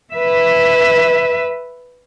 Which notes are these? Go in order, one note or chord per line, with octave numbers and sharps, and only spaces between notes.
B4 E5